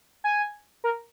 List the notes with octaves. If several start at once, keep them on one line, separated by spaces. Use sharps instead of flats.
G#5
A#4